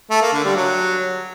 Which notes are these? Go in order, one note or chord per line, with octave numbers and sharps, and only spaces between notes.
A3
A#3
D3
G3
F#3